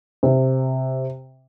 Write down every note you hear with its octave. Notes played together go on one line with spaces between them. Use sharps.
C3